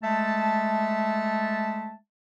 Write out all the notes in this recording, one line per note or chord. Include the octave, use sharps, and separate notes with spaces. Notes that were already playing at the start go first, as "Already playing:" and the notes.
G#3 A3 E5 A5